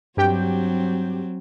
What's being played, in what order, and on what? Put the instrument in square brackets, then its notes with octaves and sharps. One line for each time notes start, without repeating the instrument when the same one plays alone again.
[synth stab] G2 G4 G5 [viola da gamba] F#3 C4